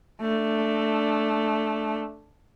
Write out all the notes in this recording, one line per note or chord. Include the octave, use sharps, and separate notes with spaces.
A3 D4